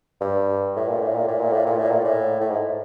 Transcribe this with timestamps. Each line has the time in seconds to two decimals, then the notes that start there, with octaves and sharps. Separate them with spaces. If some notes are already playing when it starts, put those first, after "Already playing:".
0.21 G2
0.76 A2
0.88 A#2
1.02 A2
1.15 A#2
1.27 A2
1.41 A#2
1.52 A2
1.66 A#2
1.78 A2
1.91 A#2
2.04 A2
2.40 A2
2.50 G#2